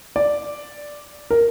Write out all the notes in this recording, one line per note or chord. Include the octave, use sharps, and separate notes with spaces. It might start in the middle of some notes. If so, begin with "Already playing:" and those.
D5
A#4